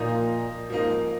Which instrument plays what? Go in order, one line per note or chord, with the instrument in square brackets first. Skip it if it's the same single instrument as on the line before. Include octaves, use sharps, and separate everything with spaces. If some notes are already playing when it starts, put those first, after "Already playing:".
Already playing: [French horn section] A#2 [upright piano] F3 A#3 D#4
[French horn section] G#2 [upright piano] F3 A#3 D#4